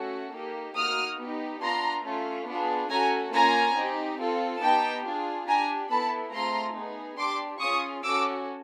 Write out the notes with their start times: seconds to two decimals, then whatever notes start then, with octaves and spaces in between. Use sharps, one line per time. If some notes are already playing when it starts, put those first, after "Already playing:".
Already playing: A3 C#4 F#4 A4
0.34 A#3 D#4 G4
0.77 A#3 D#4 F#4 D#6 F6
1.19 B3 D#4 G4
1.62 B3 D4 F4 A#5 C6
2.06 A3 C#4 F4
2.47 B3 D4 F4 G#4
2.90 A3 C#4 F#4 A4 G#5 A#5
3.33 A#3 C#4 F4 G#5 A#5
3.76 C4 D#4 G4
4.19 C4 F4 A4
4.62 B3 D#4 G4 G5 A5
5.05 D4 F4 G#4
5.47 D4 G4 G#5 A#5
5.90 B3 E4 A4 A5 B5
6.33 A3 C4 F4 G#4 A#5 C6
6.76 B3 D#4 G#4
7.18 D4 G4 C6 D6
7.61 C#4 F4 G#4 C#6 D#6
8.03 C#4 F#4 A4 D6 E6